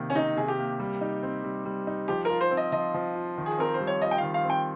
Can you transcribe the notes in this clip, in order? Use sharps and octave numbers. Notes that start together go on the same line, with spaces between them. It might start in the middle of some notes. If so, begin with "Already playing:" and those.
Already playing: C3 D#3 A#3
C#4
C3 D#4
C3 G#4
G4
A#3
G3
D#4
C4
G3
G3
D#4
F3 G4
A#4
F4
C5
C4
D#5
F3 D#5
F3
F4
D#3
G#4
C4 A#4
C5
G3
C#5
F4 D#5
G5
D#3 F5
F5
C4
G5